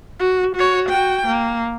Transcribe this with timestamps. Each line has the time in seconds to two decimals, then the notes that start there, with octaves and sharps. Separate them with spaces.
0.19 F#4
0.55 F#4 C#5
0.89 F#4 G5
1.27 A#3